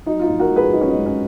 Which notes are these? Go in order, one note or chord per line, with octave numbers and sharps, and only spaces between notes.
F#3 D#4
F4
D#4
A#1
F#4 A#4
G#2 G#4 B4
F#3 D#4
C#4
D#4
G#2
C#4